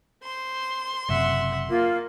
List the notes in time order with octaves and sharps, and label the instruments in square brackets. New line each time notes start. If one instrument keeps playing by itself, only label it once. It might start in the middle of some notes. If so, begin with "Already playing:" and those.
[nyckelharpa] C5 [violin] C6
[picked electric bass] F#1 F#2 C3 [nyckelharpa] E5 F#5
[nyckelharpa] A#3 [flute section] F4